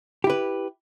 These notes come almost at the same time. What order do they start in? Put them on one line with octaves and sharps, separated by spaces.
G4 E4 B4